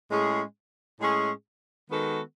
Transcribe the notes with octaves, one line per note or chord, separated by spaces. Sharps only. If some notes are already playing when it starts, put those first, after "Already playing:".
A2 G#3 C#4 G#4
A2 G#3 C#4 G#4
D#3 G#3 B3 F#4 A4